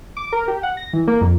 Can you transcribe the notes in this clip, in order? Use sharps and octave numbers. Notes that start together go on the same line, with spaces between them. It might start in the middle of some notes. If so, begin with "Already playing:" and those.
D6
A#4
G4
F#5
A#6
E3
A#3
F2